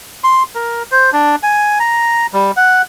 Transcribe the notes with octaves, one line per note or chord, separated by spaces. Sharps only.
C6
A#4
C5
D4
G#5
A#5
G3
F#5